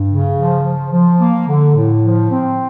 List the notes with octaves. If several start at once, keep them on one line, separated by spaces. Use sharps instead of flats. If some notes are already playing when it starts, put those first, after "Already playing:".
Already playing: G2
C#3
F3
F3
F3
A#3
D3
A2
F3
C4